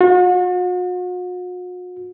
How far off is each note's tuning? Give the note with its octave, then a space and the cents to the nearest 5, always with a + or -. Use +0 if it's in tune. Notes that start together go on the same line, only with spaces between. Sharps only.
F#4 -45